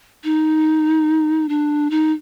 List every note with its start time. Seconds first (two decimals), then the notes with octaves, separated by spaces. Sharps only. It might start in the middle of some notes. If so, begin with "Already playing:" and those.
0.24 D#4
1.49 D4
1.90 D#4